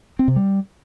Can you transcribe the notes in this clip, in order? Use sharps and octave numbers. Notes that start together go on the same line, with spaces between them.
C4
C3
G3